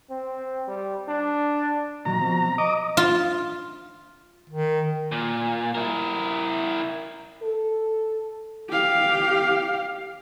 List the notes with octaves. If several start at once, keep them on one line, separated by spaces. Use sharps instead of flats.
C4
G3
D4
A#2 D#3 F#3 A#5
B2 F3 C4
D#5 D6 D#6
F4
D#3
A#2
E4 A#4
A4
G4 F5